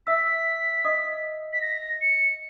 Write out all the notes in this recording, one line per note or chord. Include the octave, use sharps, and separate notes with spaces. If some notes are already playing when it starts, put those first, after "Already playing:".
E5 E6 B6
D#5 D#6
B6
A#6
C#7